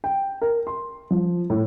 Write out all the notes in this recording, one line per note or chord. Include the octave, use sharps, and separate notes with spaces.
G5
A#4
C6
F3
A2